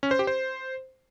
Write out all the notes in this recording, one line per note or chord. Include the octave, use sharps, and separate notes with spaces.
C#4
C5
G4
C5